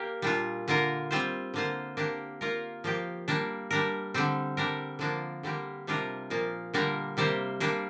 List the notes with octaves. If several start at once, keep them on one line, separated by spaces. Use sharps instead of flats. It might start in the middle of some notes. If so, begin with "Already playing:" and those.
Already playing: A#3 G4 A#4
A#2 G3 D4 F4
D3 A#3 F4 A#4
G3 C4 F4 C5
D3 A#3 F4 C5
A#3 D4 G4
A#3 F4 A#4
F3 A#3 G4
G3 A#3 D4
G3 D4 A#4
D3 G3 C4
G3 D4 A#4
D3 F3 A#3 D4
D3 G3 A#3 G4
C3 G3 D4 F4 A#4
A#2 F3 A#3
D3 G3 A#3 D4 A#4
C3 G3 A#3 G4 C5
G3 A#3 D4